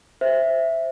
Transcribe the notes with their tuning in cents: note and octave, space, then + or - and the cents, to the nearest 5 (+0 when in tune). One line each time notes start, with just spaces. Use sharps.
C5 +0 E5 +0